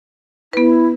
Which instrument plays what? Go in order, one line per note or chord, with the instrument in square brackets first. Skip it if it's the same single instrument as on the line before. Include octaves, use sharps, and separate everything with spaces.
[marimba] B3 B4 [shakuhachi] E4